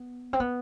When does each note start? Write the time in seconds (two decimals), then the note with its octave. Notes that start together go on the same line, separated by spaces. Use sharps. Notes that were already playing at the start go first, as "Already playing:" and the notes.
Already playing: B3
0.33 C4
0.40 B3